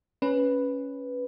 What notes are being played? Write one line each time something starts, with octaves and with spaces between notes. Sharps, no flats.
C#4 B4